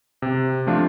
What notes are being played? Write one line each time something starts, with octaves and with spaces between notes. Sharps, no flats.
C3
F3 A3 D4 F4